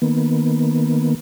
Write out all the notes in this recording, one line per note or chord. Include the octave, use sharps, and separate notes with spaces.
D#3 A#3 B3